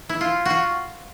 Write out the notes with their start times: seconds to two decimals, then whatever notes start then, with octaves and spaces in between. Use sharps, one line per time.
0.09 E4
0.21 F4
0.45 F4 F#4